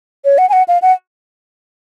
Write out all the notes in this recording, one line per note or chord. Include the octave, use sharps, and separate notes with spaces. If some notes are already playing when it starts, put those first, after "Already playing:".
C#5
F#5
G#5
F#5
F5
F#5